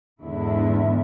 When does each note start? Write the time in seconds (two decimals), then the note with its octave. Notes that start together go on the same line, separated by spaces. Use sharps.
0.24 E2 G#2 D3 B3 E4